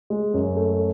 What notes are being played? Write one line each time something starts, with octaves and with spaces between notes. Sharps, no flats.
G#3
F#2
A3